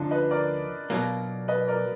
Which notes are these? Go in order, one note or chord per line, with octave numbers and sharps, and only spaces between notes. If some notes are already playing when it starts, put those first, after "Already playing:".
Already playing: D2 D3 F3 D4 D#4 F4
B4 D#5
A#4 D5
B2 F#3 A#3
B4 D#5
A#4 D5